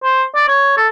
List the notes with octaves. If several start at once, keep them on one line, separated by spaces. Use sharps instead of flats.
C5
D5
C#5
A4